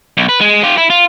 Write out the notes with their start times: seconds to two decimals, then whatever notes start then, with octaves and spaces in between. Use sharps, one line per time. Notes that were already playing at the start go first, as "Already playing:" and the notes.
0.17 B1
0.29 B4
0.41 G#3
0.63 F4 G4
0.78 E4
0.90 F4